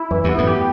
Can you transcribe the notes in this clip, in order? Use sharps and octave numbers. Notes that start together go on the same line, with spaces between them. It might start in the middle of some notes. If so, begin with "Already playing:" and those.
Already playing: E4
F#2 E3
E2 G2 B3
F#2 A2
G4